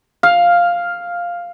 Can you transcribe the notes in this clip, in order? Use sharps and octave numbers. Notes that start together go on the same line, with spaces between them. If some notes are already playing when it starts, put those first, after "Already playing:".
F5